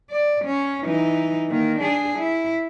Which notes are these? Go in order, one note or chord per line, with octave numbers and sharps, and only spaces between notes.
D5
C#4
E3 D#4
D#3 A#3
D4 G#4
E4